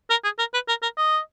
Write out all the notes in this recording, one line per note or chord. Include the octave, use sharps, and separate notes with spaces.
A#4
G#4
A#4
B4
A#4
A#4
D#5